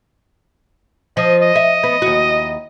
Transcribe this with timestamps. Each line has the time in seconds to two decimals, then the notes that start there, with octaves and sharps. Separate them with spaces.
1.17 F3 D#5
1.42 D#5
1.56 E5
1.83 B3
2.02 D#2 F#4